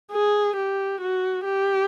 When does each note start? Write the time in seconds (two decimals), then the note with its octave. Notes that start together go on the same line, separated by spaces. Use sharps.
0.12 G#4
0.57 G4
1.01 F#4
1.45 G4